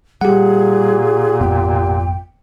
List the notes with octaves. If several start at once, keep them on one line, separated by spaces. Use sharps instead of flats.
A#2 G3 G4 G#4 F#5
G#1 F2 B3 G5